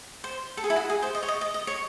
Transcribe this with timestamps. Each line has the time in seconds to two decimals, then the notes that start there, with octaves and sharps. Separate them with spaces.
0.24 C5
0.57 A4
0.64 G#4
0.70 E4
0.76 F#4
0.90 G#4
1.02 C5
1.15 D#5
1.23 C#5
1.28 D#5
1.41 D#5
1.54 D#5
1.67 C#5